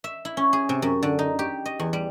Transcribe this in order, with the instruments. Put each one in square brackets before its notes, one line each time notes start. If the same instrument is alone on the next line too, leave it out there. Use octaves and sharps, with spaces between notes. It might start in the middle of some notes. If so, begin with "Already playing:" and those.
[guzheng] E5
E4
C#4
G#4
C3
F#2
D3
D#4
G4
D#5
E2
G3